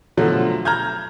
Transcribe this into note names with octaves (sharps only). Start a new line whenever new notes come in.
B2 D3 F3 F#3 A3
A#5 F6 G6 G#6